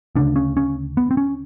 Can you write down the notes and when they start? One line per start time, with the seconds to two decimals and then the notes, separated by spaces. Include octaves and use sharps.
0.15 D2 C#3 D4
0.36 C#4
0.57 C#4
0.97 B3
1.11 C4
1.17 C#4